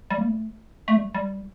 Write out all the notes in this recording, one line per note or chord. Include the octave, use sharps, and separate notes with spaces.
G3
A#3
A3
A3
G3
G3